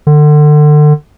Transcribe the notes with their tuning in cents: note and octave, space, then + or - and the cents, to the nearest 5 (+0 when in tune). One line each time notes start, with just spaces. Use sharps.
D3 +30